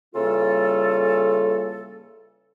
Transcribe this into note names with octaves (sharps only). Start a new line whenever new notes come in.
C#3 E3 G3 A#3 F4 A4